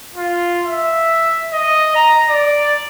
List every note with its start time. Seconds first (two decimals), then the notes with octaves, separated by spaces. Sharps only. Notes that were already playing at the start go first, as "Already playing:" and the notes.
0.16 F4
0.66 E5
1.53 D#5
1.95 A#5
2.30 D5